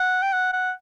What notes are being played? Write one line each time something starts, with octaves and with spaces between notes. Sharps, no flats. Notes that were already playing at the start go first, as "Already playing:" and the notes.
Already playing: F#5
G5
F#5
F#5